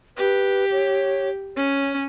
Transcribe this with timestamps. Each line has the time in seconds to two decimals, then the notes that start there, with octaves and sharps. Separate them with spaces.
0.17 G4 B4
0.72 C#5
1.57 C#4 C#5